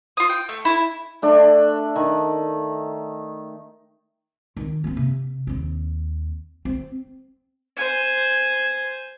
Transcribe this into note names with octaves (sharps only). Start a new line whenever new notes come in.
F4 D#6
G5
A3
E4
A3 D4
D#3
D#3 C4
A#3 C4
C3
D#2 C4
C4
C5 G#5